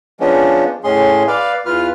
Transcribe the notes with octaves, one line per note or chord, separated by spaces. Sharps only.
F3 G#3 B3 C#4 D4
A2 G#3 C#4 G#4 C6
B4 D5 F5
E2 F4 B4 F6